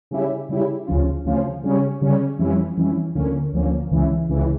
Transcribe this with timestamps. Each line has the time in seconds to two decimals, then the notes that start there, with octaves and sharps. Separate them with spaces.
0.11 C#3 G3 C#4 E4 G4
0.49 C#3 G3 C#4 E4 G4
0.87 D2 C#3 F3 C#4 F4
1.25 D2 C#3 F3 C#4 F4
1.63 C#3 G3 C#4
2.01 C#3 G3 C#4
2.39 F2 E3 G3 C#4 E4
2.77 F2 E3 G3 C#4 E4
3.15 D2 D3 F3 A#3 C#4
3.53 D2 D3 F3 A#3 C#4
3.91 C#2 C#3 E3
4.29 C#2 C#3 E3